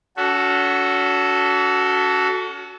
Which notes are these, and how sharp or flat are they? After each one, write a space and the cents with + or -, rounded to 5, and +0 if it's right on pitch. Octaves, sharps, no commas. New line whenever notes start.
C#4 +40 F#4 +0 A4 +0